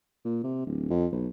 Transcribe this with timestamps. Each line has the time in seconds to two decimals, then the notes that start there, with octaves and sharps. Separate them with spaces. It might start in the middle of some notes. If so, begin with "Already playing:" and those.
0.25 A#2
0.44 C3
0.66 D1
0.90 F2
1.12 B1